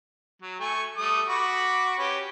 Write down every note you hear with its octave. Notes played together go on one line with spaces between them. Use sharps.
F#3
A3 G#5 C#6
G3 A3 D#6
F#4 B5 D6
C#4 G4 B4